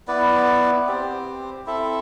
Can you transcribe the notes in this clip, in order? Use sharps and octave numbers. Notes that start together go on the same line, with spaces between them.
B3 E4 B4 D5
C4 G4 C5
C4 E4 A4 E5